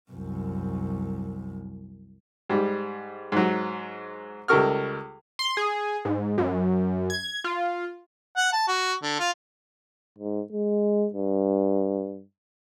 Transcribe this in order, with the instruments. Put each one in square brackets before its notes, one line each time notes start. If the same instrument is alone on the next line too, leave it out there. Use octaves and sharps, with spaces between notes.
[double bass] C2 F#2
[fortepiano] G#2 G3
G#2 F#3
C#2 G3 A4 A#4 C#6 F6
[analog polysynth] C6
G#4
G#2
F#2
G#6
F4
[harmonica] F#5
A5
F#4
D3
F4
[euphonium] G#2
G#3
G2